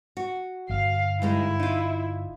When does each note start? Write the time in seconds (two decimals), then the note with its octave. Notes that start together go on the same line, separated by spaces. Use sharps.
0.17 F#4
0.69 G1 F5
1.22 G2 G#3 D#4 E4
1.60 D#4 F4